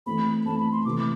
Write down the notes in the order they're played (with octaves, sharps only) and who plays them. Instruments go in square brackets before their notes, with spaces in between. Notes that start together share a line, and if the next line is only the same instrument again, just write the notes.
[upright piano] E3 A3 C4 [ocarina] B5
[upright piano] E3 A3 C4 [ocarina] A5
[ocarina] B5
C6
[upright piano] C3 E3 A3 [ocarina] D6